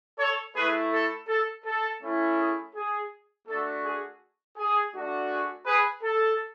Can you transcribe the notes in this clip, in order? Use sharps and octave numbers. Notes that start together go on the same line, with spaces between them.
A4 C#5
A3 E4 G#4 B4
A4
A4
A4
A3 C#4 E4
G#4
G#4
A3 D4 F#4 A4
G#4
G#4
A3 D4 F#4
G#4
G#4 B4
A4